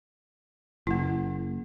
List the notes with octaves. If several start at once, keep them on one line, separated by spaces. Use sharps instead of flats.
F#1 A#3 E4